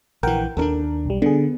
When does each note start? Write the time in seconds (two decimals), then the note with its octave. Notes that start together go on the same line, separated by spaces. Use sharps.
0.23 A#1 E3 A#4 F#5 G5
0.57 D#2 C#4 D4 A4 A#4
1.06 B1 G3
1.22 D3 B3 G#4